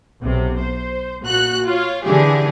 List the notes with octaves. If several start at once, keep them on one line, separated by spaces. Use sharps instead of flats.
B1 C3
C5
A#2 F#4 F#6
F4 C#5
D3 E3 G4 G#4